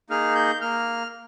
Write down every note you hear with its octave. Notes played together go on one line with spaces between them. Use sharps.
A#3 D#4 G#4 F6
G6
A#3 F6